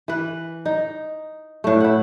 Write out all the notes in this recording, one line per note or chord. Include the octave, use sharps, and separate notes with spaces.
E3 B4
D#4
A2 A3
E4 F#5